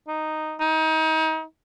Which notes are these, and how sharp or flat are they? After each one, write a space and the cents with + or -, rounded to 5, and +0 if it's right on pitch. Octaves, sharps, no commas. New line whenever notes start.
D#4 -5
D#4 +30